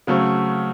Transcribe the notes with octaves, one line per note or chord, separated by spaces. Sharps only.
C#3 F#3 A3 C4